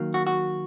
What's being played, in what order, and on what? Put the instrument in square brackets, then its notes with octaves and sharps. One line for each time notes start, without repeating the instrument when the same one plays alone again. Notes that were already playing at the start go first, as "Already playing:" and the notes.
Already playing: [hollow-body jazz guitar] D#3 F#3 A#3
F#4
F#4